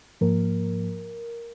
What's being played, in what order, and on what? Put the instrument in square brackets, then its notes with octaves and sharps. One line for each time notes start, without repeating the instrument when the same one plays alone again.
[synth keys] G#2 F3 A#3 A#4